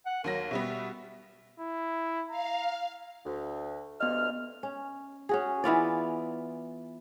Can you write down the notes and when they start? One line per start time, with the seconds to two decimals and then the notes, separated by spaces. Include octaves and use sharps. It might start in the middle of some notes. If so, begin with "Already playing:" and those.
0.06 F#5
0.24 D#2 F#3 A#4 A#6
0.51 B2 G3 B3 E5
1.59 E4
2.30 F5 A#5
3.26 D2
4.01 D2 G2 B3 D#5 F6
4.63 C#4
5.29 C#4 F#4 G#4
5.64 E3 B3 F4 D5